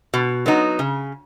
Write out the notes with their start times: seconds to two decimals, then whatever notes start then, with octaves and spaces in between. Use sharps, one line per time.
0.14 B2
0.46 F#3 B3 D#4
0.79 C#3